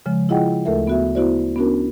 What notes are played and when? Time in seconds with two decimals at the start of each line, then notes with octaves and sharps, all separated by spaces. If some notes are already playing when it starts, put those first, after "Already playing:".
0.06 C#3 F3 G#3
0.29 E4 F4 G#4 D#5 F#5 G5
0.65 D2 A3 A4 A#4 E5
0.87 B3 F#4 E5
1.15 B3 E4 F#4 C5 D5
1.56 B3 C#4 D4 F#4 A#4